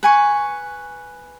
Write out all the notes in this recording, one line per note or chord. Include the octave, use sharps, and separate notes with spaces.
B4 G#5 C#6